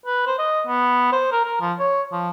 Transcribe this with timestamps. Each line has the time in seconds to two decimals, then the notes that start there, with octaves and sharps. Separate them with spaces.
0.06 B4
0.27 C5
0.39 D#5
0.67 B3
1.13 C5
1.32 A#4
1.44 A#4
1.61 F3
1.79 C#5
2.12 F3